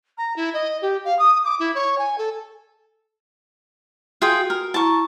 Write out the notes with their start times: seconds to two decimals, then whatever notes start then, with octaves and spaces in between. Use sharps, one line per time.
0.18 A#5
0.36 E4
0.54 D#5
0.82 G4
1.05 F5
1.19 D#6
1.45 D6
1.60 E4
1.75 C#5
1.98 G#5
2.18 A4
4.22 F4 F#4 G#4 G5
4.50 A#4
4.74 E4 A5 A#5 C#6